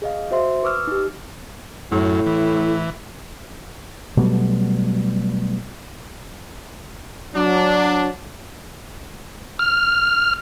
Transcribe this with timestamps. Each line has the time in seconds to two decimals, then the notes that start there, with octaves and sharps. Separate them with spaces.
0.02 G#4 D#5 F5
0.31 F#4 C5 E5 C6
0.63 B4 C#6 D6 E6 F6
0.87 D#4 G4
1.91 F#2 A2
2.26 E3
4.17 B2 F#3 G3 A3
7.35 F#3 D4
9.59 F6